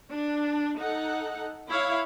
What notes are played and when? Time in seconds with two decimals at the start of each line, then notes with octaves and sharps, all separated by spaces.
0.11 D4
0.79 D#4 A4 F#5
1.69 E4 C#5 F5